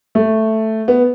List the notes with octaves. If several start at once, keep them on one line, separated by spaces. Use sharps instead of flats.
A3
B3